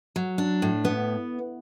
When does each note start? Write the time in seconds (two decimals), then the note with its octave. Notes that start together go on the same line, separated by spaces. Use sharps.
0.16 F#3
0.38 D4
0.62 A2
0.85 B3